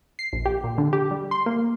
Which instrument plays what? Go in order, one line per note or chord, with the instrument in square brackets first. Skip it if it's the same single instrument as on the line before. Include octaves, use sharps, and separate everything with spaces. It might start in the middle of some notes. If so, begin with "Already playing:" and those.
[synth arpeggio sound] C7
A#1
G4
A#2
D3
G4
G3
C6
A#3